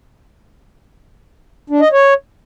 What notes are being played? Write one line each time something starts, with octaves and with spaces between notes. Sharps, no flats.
D4
D#5
C#5